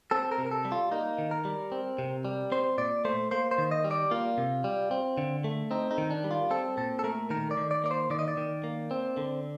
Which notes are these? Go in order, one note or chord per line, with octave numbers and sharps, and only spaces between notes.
C4 A4
A#4
C3
A#4
A4
G3
F4
A#3 D#4
D#3
A#4
G3
C4
C3
G3
C4 C5
A#2 D5
A3 C5
A#3 C5
C5
D#3
D#5
G3
D5
A#3 F4
C3
G3
C4
D3
A3
C4 D#4
D#4
D#3
D4
G3
F4
C4 A4
A#2 A4
A4
A3 A#4
D#3 A#4
D5
D#3
D5
A#3 D5
C5
D#3 D5
D#5
D5
D#3
A#3
C4
D3